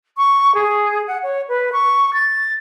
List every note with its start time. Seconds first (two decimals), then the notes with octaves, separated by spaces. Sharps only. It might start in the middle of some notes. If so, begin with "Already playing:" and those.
0.17 C#6
0.54 G#4
1.07 F#5
1.23 C#5
1.48 B4
1.72 C#6
2.13 A6